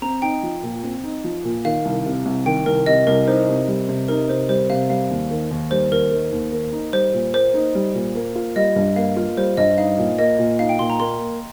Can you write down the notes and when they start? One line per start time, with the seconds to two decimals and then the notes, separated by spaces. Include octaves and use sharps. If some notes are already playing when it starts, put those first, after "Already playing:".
0.02 C4 A#5
0.22 D#4 G5
0.43 F3
0.63 A#2
0.83 C4
1.04 D#4
1.24 F3
1.44 A#2
1.65 D#3 F5
1.85 C2
2.05 C3
2.25 C2
2.46 D#3 G5
2.66 C2 A#4
2.86 C3 D#5
3.07 C2 A#4
3.27 D#4 C5
3.48 C3
3.68 G3
3.89 C3
4.08 D#4 A#4
4.29 C3 C5
4.49 G3 C5
4.70 C3 F5
4.90 G3 F5
5.10 D#2
5.31 D#3
5.51 D#2
5.71 G3 C5
5.91 D#2 A#4
6.11 D#3
6.32 D#2
6.52 A#3
6.73 D#4
6.93 G3 C5
7.14 A#2
7.34 A#3 C5
7.54 D#4
7.75 G3
7.95 A#2
8.15 A#3
8.36 F4
8.56 G3 D#5
8.76 G2
8.96 A#3 F5
9.17 F4
9.37 G3 C5
9.57 G2 D#5
9.78 D#4 F5
9.98 A#2
10.18 A#3 D#5
10.39 A#2
10.59 D#4 F5
10.69 G5
10.79 A#2 C6
10.90 A#5
10.99 A#3 C6